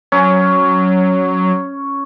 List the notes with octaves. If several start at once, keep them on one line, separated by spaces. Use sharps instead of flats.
F#3 C#4